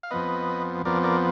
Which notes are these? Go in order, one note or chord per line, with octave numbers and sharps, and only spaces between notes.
F5
F2 F3 B3 B4 D#5
F2 F3 B3 A#4 D5
A#4 D5